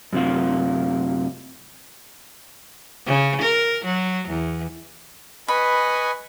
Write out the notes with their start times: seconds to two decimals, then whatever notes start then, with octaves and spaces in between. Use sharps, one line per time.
0.13 F#2 C3 F4
3.06 C#3
3.42 A#4
3.85 F#3
4.29 E2
5.48 B4 D#5 G#5 B5 C#6